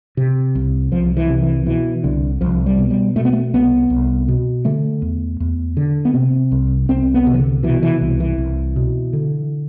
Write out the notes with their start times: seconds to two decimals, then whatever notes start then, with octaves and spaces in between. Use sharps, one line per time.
0.17 C3
0.55 C2
0.92 C2 F3
1.17 E3
1.29 C3
1.42 E3
1.66 B2 E3
2.04 C2 D3
2.41 C2 F3
2.66 G3
2.79 B2
2.91 G3
3.16 B2 A3
3.25 B3
3.33 A3
3.54 C2 B3
3.90 C2
4.28 B2
4.65 D3 A3
5.02 E2
5.40 E2
5.77 D3
6.05 B3
6.14 C3 C4
6.52 C2
6.89 C2 C4
7.14 B3
7.27 C3
7.34 E3
7.39 D3
7.63 B2 E3
7.83 E3
8.01 C2
8.20 E3
8.38 C2
8.76 B2
9.13 D3